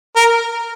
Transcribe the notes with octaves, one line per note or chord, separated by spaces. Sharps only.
A#4